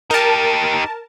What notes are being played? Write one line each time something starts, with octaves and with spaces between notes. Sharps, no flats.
D#4 G4 A#4 A5